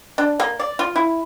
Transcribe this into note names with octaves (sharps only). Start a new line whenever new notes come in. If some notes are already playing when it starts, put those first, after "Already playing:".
D4
A#3
D5
F4
E4